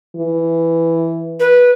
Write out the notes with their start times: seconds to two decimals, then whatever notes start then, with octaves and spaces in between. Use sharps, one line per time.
0.16 E3
1.40 B4